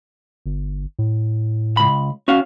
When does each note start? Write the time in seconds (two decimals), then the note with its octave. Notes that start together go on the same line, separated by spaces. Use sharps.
0.46 G1
0.99 A2
1.77 C#2 B5
2.28 C#4 F#4 F5